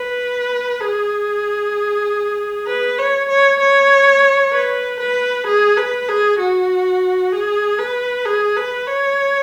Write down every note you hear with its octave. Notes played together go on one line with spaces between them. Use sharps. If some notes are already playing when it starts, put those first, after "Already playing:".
Already playing: B4
G#4
B4
C#5
C#5
C#5
B4
B4
G#4
B4
G#4
F#4
G#4
B4
G#4
B4
C#5